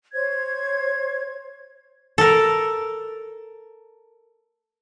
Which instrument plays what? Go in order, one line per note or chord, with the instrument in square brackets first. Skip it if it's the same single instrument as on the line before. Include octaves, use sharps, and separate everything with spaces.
[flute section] C5 C#5 G#6
[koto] A4 A#4